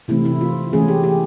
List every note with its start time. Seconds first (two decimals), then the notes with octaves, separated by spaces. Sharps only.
0.08 C3 E3 A3 C4 E4
0.25 E4
0.41 F4
0.73 E3 A3 C#4 G#4
0.88 G4
1.04 G4